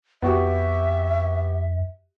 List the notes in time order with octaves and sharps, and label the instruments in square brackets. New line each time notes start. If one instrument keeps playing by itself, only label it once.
[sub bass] F2 [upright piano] B3 F#4 G4 [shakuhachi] E5